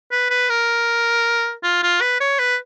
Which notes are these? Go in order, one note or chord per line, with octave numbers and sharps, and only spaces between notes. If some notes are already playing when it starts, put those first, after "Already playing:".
B4
B4
A#4
F4
F4
B4
C#5
B4